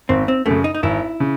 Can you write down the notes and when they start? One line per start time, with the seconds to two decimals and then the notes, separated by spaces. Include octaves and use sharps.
0.09 G#1 C4
0.28 C4
0.46 F#2 C#3 A3
0.64 D#4
0.75 D#4
0.83 G#1 E4
1.20 C#3